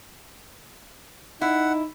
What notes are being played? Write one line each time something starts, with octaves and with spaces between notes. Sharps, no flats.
D#4 E4 F#5